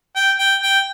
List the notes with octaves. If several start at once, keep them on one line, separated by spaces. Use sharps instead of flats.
G5
G5
G5